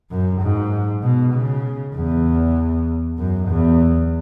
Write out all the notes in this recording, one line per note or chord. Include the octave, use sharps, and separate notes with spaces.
F#2
G#2
B2
C#3
E2
F#2
E2